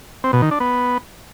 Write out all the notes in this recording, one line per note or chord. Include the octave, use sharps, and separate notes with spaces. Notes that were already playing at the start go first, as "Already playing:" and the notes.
C4
B2
D#3
D4
B3